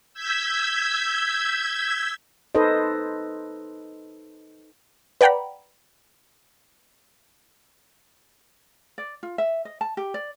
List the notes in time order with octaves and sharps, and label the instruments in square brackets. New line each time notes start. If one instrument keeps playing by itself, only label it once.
[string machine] E6 G6 G#6 B6
[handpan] D#4 A4 B4 C5 D#5
[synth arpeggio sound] B4 D5 F#5 G5 A#5 B5
[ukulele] D5
F4
E5
D#5
A5
G4
D5